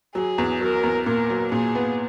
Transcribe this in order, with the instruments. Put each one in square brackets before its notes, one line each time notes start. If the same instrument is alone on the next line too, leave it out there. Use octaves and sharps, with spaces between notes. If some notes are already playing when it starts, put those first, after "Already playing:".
[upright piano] F#3 [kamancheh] G#4
[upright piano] E2
[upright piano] F#3 [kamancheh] A#4
[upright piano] E2
[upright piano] A#2 [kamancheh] A#4
[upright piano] F#3
[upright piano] A#2 [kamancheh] G#4
[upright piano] B3